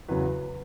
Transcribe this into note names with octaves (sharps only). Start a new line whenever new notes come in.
E2 C#3 F#3 B4